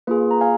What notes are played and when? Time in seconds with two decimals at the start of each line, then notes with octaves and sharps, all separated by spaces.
0.07 A#3 F4 G#4 B4
0.31 A#5
0.41 F5 G#5